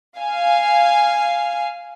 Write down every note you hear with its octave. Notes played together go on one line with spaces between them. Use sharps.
F5 G#5